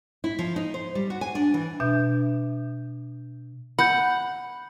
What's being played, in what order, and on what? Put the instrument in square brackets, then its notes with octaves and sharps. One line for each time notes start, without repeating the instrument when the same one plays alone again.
[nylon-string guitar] E4
F3
D#4
C5
G3
F#4
G#5
D4
E3
[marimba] B2 D4 E5 G6
[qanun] F#5 [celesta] B5 G6